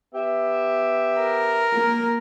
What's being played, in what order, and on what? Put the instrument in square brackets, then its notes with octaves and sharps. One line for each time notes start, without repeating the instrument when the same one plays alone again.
[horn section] B3 G4 E5
[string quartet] A#4
[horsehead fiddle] A#3